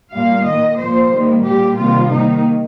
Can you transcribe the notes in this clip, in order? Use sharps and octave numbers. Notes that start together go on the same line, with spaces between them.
A#2 G3 A#3 F5
D#3 A#3 D#5
A#2 F3 A#3 C5
D#3 G3 A#3
A#2 G3 A#3 G4
C3 D#3 G3 A#3 F4
D#3 A#3 D#4